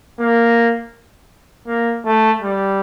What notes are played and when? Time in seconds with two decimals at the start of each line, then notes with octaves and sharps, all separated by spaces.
0.20 A#3
1.67 A#3
2.05 A3
2.42 G3